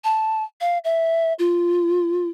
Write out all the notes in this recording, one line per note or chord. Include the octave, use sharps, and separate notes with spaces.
A5
F5
E5
F4